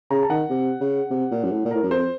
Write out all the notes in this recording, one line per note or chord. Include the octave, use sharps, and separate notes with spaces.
C#3 A#5
A5
D#3 F#5
C3
C#3
C3
A#2
F#2
A2
A#2
A2 A#4
F#2
F2 C5